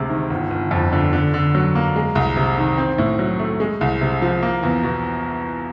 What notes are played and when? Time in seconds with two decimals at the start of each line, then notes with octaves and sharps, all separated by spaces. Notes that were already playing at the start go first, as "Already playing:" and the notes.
Already playing: D2 C3 G#3
0.09 D#3
0.30 G1
0.50 G1
0.71 F2
0.92 D3
1.13 D3
1.34 D3
1.55 F#3
1.75 A#3
1.96 G#3
2.15 C2
2.37 C3
2.58 D#3
2.78 C4
2.98 A2
3.19 F#3
3.39 A3
3.60 G#3
3.81 C2
4.01 C3
4.22 F3
4.42 A#3
4.63 E2
4.83 B2